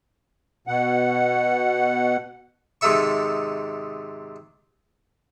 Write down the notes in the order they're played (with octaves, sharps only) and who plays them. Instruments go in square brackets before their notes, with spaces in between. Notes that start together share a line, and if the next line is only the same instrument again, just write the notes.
[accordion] B2 F#5
[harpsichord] G#2 C3 D#3 A4 E5 C#6